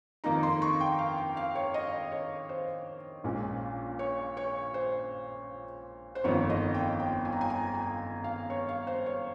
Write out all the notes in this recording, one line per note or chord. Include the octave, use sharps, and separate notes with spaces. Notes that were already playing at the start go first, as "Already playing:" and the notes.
F2 D#3 A#3 D#4 A#5
C6
C#6
G5
F5
G5
F5
C#5
D#5
C#5
C5
A#1 A#2 G#3 C#4
C#5
C#5
C5
C5
G1 F2 D#3 A#3 C#5
D#5
G5
G5
G#5
A#5
G#5
A#5
G#5
F5
C#5
F5
C5
C#5